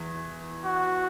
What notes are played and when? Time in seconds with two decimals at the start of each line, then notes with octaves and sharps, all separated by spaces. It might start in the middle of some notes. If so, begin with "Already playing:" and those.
Already playing: E2 E3
0.65 F#4